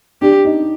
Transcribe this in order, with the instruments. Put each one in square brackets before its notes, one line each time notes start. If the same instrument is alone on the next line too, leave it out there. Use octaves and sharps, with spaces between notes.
[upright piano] D4 [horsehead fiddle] G4
[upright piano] D#4